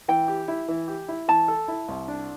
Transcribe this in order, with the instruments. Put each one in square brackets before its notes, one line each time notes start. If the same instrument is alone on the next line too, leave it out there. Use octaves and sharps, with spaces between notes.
[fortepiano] E3 [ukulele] G5
[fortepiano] G4
E4
E3
G4
E4
[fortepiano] E3 [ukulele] A5
[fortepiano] A4
E4
C2
D4